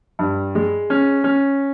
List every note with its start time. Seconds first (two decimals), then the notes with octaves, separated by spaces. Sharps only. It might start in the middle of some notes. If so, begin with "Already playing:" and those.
0.19 G2
0.55 G#3
0.90 C#4
1.24 C#4